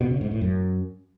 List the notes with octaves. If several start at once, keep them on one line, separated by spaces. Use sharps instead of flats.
B2
C#3
G#2
A2
F#2